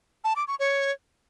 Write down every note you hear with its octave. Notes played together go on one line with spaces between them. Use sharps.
A5
D6
C#6
C#5